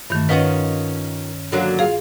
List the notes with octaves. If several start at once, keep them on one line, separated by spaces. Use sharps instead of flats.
G2 D#3 E3 A3
D#3 C#4 F4 B4 C#5 D#5 F#5
D3 F#3 A#3
F4 G#4 F5